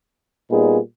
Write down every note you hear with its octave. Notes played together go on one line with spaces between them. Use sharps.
A#2 G3 B3 D#4 G#4